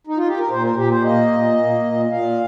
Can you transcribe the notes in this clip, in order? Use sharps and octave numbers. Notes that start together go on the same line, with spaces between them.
D#4
F4
G4
A#4
A#2 C5
A#4
A#2 G4
C5
A#3 D#5
A#2
A#3
A#2
A#2 F5